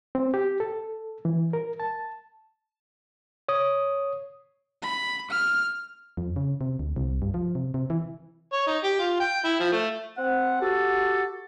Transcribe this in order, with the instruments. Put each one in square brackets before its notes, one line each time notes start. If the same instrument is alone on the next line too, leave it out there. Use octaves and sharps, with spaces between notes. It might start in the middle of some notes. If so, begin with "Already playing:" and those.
[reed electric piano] C4
G4
A4
E3
A#4
A5
[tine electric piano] C#5 D#6
[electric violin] B5
F6
[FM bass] F2
C#3
C3
D2
C2
G2
F3
C3
C3
E3
[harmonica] C#5
D#4
G4
F4
G5
E4
F3
A3
[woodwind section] C4 F#5
F#4 G4 A4